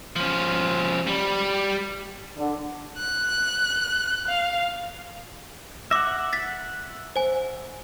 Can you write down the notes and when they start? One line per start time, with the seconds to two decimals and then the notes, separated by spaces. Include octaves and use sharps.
0.16 F3 C#4
1.07 G3
2.37 D3
2.97 F#6
4.27 F5
5.91 E5 F#5 D6 A#6
6.33 A6 B6
7.16 C5 G#5